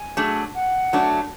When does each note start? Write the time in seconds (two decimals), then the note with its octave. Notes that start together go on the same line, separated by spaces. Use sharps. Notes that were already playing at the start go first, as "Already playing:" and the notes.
Already playing: G#5
0.17 F#3 A3 D4 G#4
0.55 F#5
0.93 F#3 A3 D4